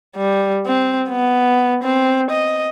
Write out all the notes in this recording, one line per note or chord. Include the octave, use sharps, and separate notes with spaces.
G3
C4
B3
C4
D#5